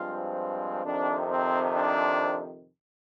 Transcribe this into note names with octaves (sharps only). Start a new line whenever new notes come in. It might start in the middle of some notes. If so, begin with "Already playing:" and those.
Already playing: G2 F3 G#3 C4 F4
F2 C3 D#3 D4
C4
D4